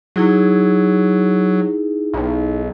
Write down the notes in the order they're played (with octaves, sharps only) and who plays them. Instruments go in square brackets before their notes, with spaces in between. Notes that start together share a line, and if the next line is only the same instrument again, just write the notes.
[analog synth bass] F#3 [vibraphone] D#4 E4 G#4
[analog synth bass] B1